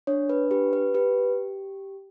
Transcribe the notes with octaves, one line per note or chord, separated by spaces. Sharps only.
D4 C#5
B4
G4 B4
B4
G4 B4